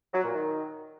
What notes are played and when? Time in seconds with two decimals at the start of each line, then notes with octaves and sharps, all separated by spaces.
0.13 F#3
0.24 A#2
0.35 D#3